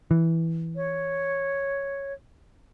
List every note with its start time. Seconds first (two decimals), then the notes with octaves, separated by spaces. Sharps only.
0.11 E3
0.76 C#5